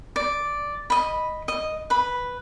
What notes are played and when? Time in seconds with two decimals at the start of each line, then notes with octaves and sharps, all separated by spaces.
0.16 D5
0.90 D#5 B5
1.48 D#5
1.90 B4 B5